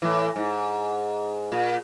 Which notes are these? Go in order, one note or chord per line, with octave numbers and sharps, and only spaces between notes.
A2 E3
G#2
A#2